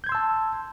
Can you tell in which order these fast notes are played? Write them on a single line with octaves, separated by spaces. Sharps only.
G6 G#6 C6 E6 A5